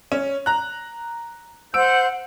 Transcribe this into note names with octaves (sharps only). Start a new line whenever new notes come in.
C#4
A#5 F#6
C5 F#5 E6 G6 D7